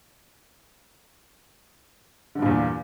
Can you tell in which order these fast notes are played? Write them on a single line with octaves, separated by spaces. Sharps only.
D3 G2 A#2 E2